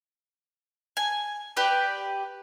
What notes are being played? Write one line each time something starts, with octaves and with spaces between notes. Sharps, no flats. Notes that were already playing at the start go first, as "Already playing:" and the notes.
G#5
G4 B4 D5